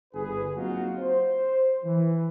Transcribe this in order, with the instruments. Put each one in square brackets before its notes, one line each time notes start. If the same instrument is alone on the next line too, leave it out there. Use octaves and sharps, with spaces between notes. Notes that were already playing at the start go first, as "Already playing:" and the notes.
[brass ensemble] G1 G#4 B4
F#3 A#3 C4 D#4 F4 F#4
C5
E3